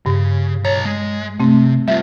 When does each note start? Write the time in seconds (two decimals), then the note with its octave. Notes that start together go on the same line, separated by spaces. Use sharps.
0.06 G2 C#3
0.65 B1 C#5 A#5
0.85 G#3
1.40 C3 A3 C4
1.88 G3 F4 E5